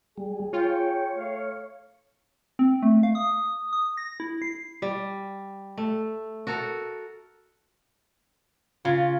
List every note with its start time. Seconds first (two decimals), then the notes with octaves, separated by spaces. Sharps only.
0.18 G3 G#4
0.53 F4 C#5 G5
1.15 A3 F5
2.59 C4
2.82 A3
3.03 F5
3.15 D#6
3.73 D#6
3.97 A#6
4.20 E4
4.42 C7
4.82 G3
5.78 A3
6.47 F#4 A4 A#4
8.85 C#3 F4